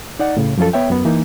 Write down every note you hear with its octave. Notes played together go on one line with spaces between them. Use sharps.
D#4 D5 F#5
A2 C#3
F#2 F3 C#4 F4 A4
B3 C#5 E5 G5
F#2 B3
E3 A#3 D#4